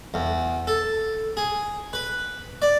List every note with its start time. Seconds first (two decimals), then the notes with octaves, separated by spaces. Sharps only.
0.14 E2
0.67 A4
1.37 G#4
1.93 B4
2.62 D5